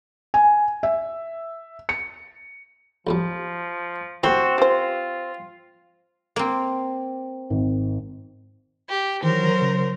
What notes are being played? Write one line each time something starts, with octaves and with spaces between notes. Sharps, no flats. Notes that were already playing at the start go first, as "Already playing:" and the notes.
G#5
E5
C#7
B1 F2 F3 G3
D#2 A2 C4 E4 F#4
F4 G4 C5
A#3 C4
G#1
G4
D#3 E3 F#3 A#4 C5
C#3